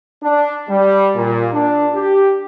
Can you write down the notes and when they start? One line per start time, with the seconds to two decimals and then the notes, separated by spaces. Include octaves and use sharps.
0.23 D4
0.69 G3
1.16 A#2
1.53 D4
1.95 G4